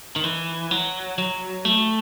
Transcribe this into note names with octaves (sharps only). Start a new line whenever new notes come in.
D#3
E3
F#3
F#3
A3